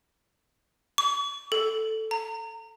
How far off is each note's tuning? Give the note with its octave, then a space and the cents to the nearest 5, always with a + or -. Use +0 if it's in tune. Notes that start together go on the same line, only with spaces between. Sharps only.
C#6 +45
A4 +0
A#5 -30